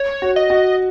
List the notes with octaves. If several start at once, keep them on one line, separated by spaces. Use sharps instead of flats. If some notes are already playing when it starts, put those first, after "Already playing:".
Already playing: C#5
F#4
D#5
F#4